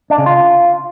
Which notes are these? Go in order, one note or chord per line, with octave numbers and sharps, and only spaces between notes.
D4
C#3
F4